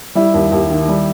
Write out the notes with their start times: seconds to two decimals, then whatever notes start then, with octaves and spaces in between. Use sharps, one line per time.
0.15 G3 E4
0.34 D#2
0.52 D#2
0.70 D#3
0.88 G3